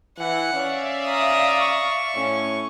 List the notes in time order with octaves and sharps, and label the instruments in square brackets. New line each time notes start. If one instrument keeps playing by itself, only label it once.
[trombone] E3 [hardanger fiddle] F#5
[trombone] C#4 [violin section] D5 E5 F5
[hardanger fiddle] A#5 D#6
[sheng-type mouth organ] C#6
[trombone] A2 [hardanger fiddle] C#4